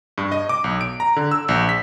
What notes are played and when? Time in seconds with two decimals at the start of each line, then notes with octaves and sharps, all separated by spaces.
0.18 G2
0.32 D#5
0.49 D6
0.64 B1
0.81 D7
1.00 A#5
1.16 D3
1.31 E6
1.48 A#1
1.69 B6